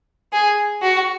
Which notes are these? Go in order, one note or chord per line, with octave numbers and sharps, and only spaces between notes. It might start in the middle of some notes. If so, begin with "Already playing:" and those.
G#4
F#4